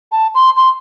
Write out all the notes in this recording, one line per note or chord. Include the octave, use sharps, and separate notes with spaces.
A5
C6
C6